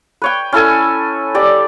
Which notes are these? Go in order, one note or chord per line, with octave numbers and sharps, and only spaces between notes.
B4 C#5 G5
C#4 E4 A4 G#5
G4 D5